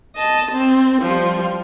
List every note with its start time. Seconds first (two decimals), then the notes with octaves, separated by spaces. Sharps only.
0.16 D#5 A5
0.52 C4
1.02 F3 G3